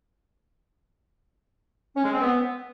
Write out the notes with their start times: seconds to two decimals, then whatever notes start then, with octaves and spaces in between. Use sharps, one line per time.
1.96 C#4
2.04 G#3
2.13 C4
2.21 B3